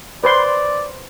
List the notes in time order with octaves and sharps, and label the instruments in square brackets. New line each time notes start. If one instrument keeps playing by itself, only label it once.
[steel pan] B4 C5 C6 [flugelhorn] D5